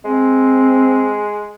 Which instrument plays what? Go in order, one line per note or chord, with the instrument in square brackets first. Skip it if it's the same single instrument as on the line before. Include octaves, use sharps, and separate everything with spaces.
[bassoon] G#3 [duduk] C4